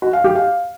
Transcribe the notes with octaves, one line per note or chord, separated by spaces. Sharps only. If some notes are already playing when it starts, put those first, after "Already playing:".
F#4
F5
G4
F5